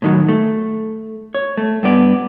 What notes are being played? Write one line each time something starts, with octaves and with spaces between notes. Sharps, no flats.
A2 D#3 F#3
A3
C#5
A3
G2 B3 D5